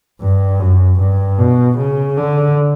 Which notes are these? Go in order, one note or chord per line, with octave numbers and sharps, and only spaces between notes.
G2
F#2
G2
B2
C#3
D3